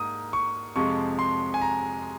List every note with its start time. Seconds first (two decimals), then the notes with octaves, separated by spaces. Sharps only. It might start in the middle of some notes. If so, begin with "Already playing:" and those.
Already playing: G#2 A#3 D#6
0.33 C#6
0.76 F2 C3 F3 G#3 C#6
1.19 C6
1.54 G#5
1.61 A#5